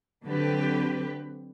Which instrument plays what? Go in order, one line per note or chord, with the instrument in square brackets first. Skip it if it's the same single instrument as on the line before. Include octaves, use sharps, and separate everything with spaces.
[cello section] D3 F#3 C4 G4 B4